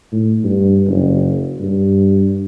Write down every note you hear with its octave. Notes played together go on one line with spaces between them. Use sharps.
A2
G2
F#1
G2